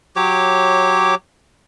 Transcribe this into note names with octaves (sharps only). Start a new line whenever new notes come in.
F#3 G4 C#5 D6